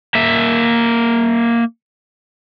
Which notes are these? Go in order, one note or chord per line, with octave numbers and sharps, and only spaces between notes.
A#3 E5